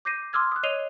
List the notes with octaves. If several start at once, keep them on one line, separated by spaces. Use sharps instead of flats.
D6 G6 A#6 C7 D#7
C6 D6 E6 F6 G#6
D#6 F#6
C#5 D#5 C7 D#7 F7 G7